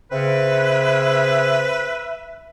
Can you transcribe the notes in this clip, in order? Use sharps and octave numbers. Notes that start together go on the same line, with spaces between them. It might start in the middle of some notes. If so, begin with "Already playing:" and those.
C#3 C4 B4 E5